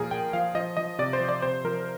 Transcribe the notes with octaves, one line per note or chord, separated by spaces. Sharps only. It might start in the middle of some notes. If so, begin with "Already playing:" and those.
Already playing: A#2 F3 G#4 A#4
A#2 G5
F3 F5
F3 D#5
F3 D#5
C3 D5
C5
F3
D5
C3 C5
F3 A#4